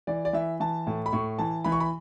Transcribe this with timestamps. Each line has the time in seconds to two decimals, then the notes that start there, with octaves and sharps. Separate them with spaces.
0.07 E3 D5
0.25 D5
0.33 E3 E5
0.60 E3 A5
0.87 A2
1.06 B5
1.13 A2 C#6
1.39 E3 A5
1.65 E3 B5
1.72 C#6
1.80 B5